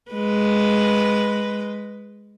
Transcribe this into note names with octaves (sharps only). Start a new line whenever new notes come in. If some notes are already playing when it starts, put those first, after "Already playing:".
G#3 B4